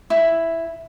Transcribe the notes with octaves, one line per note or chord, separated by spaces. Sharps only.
E4